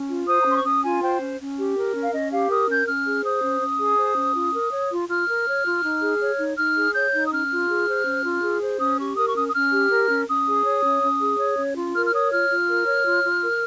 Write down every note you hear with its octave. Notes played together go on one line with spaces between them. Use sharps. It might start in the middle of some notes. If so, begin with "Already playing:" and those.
Already playing: C#4
F4
C5 D#6
A#5
C#4 C6
C#6
C#4 D#6
F4 G#5
C5 G5
C#4
C#4
G4
A#4
C#4
F5
C#4 D#5
G4 F5
A#4 D#6
C#4 G6
C#4 F6
G#4
C5 D#6
C#4
C#4
G#4
C5
C#4
F4
A#4
C#5
F4
F4 F6
A#4
C#5
F4
D#4
G#4
C#5
D#4
D#4 F6
G#4
C#5 G6
D#4
D#6
C#4 F6
F4
G#4
C5
C#4
F4
G#4
C5
C#4 D#6
G4 C#6
A#4 D#6
C#6
C#4 D#6
D#6
C#4 F6
G4
A#4
C#4
C#4 D#6
G#4
C#5
C#4
C#4
G#4
C#5
C#4
F4
A#4 F6
F6
C#5 D#6
F4 F6
F4
A#4
C#5
F4
F4
A#4